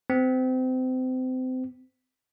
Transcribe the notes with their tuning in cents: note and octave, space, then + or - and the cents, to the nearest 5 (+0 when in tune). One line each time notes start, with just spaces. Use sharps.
C4 -30